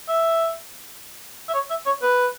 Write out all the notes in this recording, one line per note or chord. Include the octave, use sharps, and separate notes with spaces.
E5
E5
C#5
E5
C#5
B4